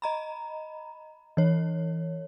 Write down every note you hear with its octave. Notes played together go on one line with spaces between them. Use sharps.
D#5 A#5 B5
E3 C#5